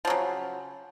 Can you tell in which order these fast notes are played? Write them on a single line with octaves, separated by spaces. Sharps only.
F3 F#3 C#3